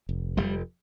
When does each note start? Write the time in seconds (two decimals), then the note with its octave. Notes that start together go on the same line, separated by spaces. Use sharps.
0.09 F1
0.37 F1 G3